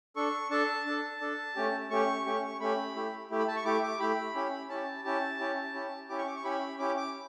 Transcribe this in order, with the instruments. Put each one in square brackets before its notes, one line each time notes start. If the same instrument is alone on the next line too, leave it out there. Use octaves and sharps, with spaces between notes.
[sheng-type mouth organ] D4 A4 C#6
D4 A4 A5
D4 A4
D4 A4
A3 C#4 G4
A3 C#4 G4 C#6
A3 C#4 G4 C#6
A3 C#4 G4 B5
A3 E4 G4
A3 E4 G4
B5
A5
C#6
A3 E4 G4 D6
D6
A3 E4 G4 B5
C#4 E4 G4
C#4 E4 G4 A5
C#4 E4 G4 A5
C#4 E4 G4
C#4 E4 G4
C#4 E4 G4 D6
C#6
D6
C#6
C#4 E4 G4 B5
C#4 E4 G4 D6
D6